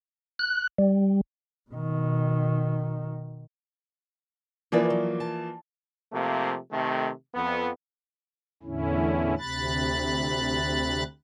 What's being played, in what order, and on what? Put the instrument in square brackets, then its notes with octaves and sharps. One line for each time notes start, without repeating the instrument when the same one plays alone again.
[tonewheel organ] F#6
G3
[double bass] B2 D#3
[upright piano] E3 F3 A#3 [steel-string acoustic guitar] E4 B4 D5
[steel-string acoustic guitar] F#3
A5
[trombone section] C3 F3 A3 A#3
C3 D#3 A3
F2 B3
[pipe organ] E2 A2 D3 C#4 E4
D2 C3 B5 F#6 A6